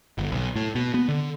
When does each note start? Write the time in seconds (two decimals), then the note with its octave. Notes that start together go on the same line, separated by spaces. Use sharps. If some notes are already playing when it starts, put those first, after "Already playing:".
0.18 G1
0.32 B1
0.56 A2
0.75 B2
0.94 B3
1.09 D3